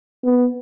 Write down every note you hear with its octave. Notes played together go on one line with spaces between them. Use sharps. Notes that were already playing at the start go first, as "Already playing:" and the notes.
B3